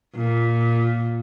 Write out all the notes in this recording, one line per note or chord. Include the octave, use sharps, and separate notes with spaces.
A#2